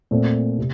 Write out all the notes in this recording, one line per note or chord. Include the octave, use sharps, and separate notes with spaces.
A#2 A3 C4
C3